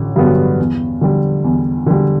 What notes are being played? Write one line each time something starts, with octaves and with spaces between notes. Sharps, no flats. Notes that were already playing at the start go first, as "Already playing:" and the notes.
Already playing: A1 D3
G2 D3 F#3 B3
E2
D3 G3
E2
D3 G3